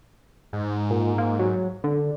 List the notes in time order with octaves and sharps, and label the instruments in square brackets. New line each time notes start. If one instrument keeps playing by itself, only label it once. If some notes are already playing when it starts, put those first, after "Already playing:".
[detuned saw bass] G#2
[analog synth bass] A#2
A#3
F#3
D3